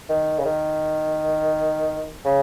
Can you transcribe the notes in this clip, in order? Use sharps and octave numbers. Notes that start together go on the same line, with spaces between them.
D#3
C#3
D#3
C#3